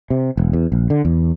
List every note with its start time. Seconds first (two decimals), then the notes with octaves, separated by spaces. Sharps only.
0.10 C3
0.37 E1
0.53 E2
0.72 A#1
0.90 D3
1.05 E2